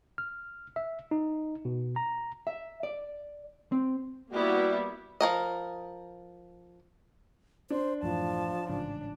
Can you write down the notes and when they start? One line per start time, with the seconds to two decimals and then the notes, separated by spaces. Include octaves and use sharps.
0.18 F6
0.76 E5
1.11 D#4
1.65 B2
1.96 A#5
2.47 E5
2.83 D5
3.72 C4
4.33 G3 A#3 B3 E4 F#4
5.21 F3 A#4 D#5
7.70 D4 C5
8.03 F#2 A2 E3 F3 A5
8.69 A1 G#2 C#3 D4